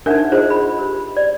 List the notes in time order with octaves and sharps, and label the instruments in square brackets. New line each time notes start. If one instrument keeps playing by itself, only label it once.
[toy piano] D4 D#4 [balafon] A#4 E5 F#5
[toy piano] F4 C5 [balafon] G#4 D#5
[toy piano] B5
[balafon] G4
[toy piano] D5